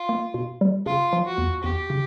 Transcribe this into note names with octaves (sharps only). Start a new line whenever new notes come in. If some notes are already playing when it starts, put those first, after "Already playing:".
Already playing: F4
A#3
B2
G3
C#3 F4
F3
F#4
E2
E2 G4
C#3